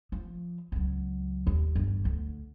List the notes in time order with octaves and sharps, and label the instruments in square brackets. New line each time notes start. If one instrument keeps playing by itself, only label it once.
[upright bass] F3
C#2 F#3
D#2
G1 E3
D2